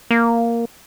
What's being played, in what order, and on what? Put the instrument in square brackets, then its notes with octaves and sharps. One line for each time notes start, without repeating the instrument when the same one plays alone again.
[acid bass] A#3